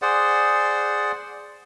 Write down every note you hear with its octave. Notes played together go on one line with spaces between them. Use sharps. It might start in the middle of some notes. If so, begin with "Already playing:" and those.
G#4 C5 D5 F#5